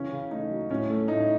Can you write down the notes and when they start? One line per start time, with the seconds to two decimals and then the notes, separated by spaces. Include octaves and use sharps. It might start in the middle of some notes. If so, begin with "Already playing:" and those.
Already playing: C#3 E3 C#4
0.12 C#3
0.31 A3 D#4
0.50 F#3
0.69 A2 C#4
0.90 A3
1.08 A2 D#4